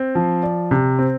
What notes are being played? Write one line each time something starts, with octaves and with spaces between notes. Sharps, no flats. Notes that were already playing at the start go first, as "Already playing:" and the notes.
Already playing: C4
F3
D5
C3
C4